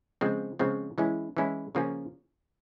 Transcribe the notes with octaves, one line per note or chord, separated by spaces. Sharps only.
C#3 F3 G#3 C4
C#3 F3 G#3 C4
E3 G#3 C#4 E4
E3 G#3 C#4 E4
C#3 F3 A#3 C#4